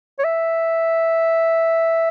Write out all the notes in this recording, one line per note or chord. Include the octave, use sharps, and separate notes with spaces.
C#5
E5